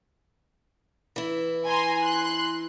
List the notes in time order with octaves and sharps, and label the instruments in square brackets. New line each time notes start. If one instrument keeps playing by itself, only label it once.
[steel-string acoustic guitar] E3 E4
[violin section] G#5 A#5 C6
C6 F#6